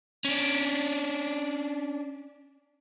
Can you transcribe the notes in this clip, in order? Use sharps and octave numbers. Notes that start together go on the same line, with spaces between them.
C#4 D4